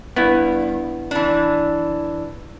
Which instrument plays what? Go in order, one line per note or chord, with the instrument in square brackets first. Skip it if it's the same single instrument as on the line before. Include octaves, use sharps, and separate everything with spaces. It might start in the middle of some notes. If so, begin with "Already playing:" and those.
[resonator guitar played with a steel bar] G2 [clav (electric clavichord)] B3 E4
[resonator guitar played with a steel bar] E3 D4